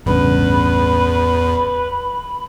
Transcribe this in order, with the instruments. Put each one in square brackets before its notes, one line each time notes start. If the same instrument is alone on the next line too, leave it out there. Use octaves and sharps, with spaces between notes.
[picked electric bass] A1 G2 C#3 [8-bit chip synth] E2 [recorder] B4 [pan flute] B5